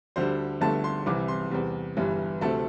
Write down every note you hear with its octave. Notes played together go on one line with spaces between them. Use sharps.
D2 D3 G3 C5
G1 G2 D3 A3 A5
C6
C2 C3 E3 G3 D6
C6
E2 C3 G3
G1 G2 E3 G3
D2 C3 A3 A5